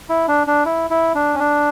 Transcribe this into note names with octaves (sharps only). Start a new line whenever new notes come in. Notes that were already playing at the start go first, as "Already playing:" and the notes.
E4
D4
D4
E4
E4
D4
C#4
D4